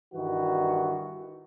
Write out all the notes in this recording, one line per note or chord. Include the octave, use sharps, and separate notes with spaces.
G2 D#3 E3 F#4